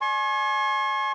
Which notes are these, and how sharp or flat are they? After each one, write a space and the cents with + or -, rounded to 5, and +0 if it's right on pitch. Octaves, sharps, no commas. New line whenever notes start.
D5 +0 G#5 +30 C#6 -45